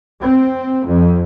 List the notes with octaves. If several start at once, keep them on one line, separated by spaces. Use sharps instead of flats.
C4
F2